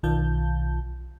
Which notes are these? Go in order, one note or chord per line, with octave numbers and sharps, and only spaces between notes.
B1 D#3 F4 A5 G6